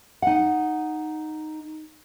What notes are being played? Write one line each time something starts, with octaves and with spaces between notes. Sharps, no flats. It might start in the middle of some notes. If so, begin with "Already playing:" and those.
D#4 F#5